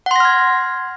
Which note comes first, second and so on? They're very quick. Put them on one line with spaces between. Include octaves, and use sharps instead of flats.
F#5 C6 A#6 F6 G#6